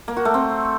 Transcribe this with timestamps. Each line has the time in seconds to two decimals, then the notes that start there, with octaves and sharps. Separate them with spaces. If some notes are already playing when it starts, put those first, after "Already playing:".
0.08 A#3
0.17 F#4
0.25 A3
0.34 C4